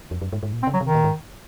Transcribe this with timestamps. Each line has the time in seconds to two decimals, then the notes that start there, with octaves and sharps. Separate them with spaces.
0.11 F2
0.22 F#2
0.33 G#2
0.43 G#2
0.53 A#2
0.63 C4
0.67 C#3
0.73 F#3
0.81 C3 D#3
0.95 A#2
1.04 G#2